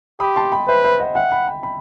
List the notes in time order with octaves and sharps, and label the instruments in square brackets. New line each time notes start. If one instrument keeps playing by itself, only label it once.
[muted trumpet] G4 [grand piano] B5 D#6
[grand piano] A5 C6
G5 B5
[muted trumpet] B4 [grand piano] C5 E5
[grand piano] C5 E5
D#5 F#5
[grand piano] E5 G5 [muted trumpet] F#5
[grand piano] G5 B5
G5 B5
G5 B5